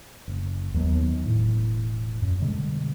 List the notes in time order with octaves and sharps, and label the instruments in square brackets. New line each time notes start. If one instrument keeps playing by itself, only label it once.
[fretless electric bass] F#1
D#2 F#3 B3
E1 A2
F#2
B2 D3 G3 G#3